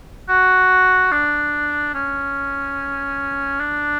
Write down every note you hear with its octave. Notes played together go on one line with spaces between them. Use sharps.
F#4
D4
C#4
D4